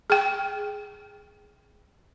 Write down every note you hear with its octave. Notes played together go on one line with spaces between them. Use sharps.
G#4 G5